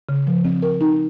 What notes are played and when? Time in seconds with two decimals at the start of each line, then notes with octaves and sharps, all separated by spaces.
0.09 C#3
0.27 F3
0.45 C4
0.62 A#4
0.81 D#4